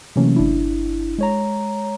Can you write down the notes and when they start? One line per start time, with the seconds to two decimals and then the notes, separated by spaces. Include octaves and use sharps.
0.16 C3 E3 F#3 A3 A#3 C#4
0.36 G1 D4 E4
1.18 G#3 C#5 A#5